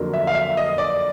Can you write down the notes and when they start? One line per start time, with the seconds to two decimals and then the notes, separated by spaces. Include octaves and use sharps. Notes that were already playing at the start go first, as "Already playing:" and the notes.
Already playing: F2 D3 F#3 A#3
0.14 E5
0.27 F5
0.35 E5
0.57 D#5
0.78 D5